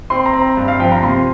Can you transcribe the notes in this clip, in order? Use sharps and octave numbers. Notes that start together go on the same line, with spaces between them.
C4 C6
A#5
C4
A#5
G2
F5
F3 G5
A#5
C3 C6